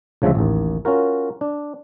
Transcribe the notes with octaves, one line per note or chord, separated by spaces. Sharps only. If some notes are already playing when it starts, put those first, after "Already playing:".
D2 C#3 F3 F#3 G#3 E5
A1 D#2
C#4 F4 F#4 A#4
D4